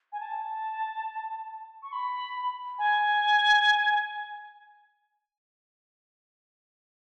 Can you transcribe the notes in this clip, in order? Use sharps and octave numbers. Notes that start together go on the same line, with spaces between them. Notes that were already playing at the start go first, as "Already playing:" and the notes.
G#5
A5
C#6
B5
G#5